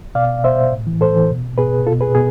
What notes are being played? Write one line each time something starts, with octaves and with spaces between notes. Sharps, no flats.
B2 D5 F5
B2 C5 E5
A2
E3
A2 A4 C5
E3
B2
B2 G#4 B4
B2 F4 A4
G#4 B4
B2 G#4